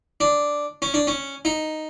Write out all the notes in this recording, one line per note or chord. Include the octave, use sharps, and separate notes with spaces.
D4
C#4
D4
C#4
D#4